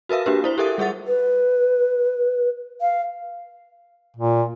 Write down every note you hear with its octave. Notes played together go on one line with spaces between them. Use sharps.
F#4 A#4 B4 E5 F5
A#3 D4 F#4 G4 B4
E4 C5 G7
G4 A4 A#4 E5 D#6
G3 G#4 E5 F#5 A6
B4
F5
A#2